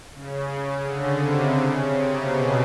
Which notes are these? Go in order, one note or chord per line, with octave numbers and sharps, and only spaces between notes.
C#3
D3
C3
C#3
C3
B2